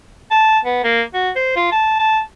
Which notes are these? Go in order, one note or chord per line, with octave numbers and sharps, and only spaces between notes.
A5
B3
A#3
F#4
C5
F4
A5
A5